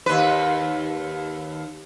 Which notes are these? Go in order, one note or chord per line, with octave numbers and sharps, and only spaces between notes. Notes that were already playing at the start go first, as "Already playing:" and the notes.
D#2 B4